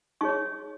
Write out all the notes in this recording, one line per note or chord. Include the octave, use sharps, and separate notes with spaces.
D#4 G#4 C#5 C#6